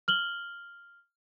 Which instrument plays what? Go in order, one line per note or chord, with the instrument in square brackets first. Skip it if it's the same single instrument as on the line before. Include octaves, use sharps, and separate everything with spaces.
[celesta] F6 F#7 G7